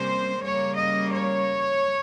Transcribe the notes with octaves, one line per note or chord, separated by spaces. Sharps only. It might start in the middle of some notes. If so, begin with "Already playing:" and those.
Already playing: C3 G3 A#3 C#4 C5
C#3 G3 A#3 C#5
D#5
C#5